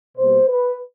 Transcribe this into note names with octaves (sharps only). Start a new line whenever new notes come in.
B2 G3 A#3 C5
B4